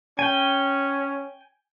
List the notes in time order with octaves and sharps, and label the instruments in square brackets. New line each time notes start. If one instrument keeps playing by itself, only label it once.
[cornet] C#4 [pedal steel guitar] G5 G#5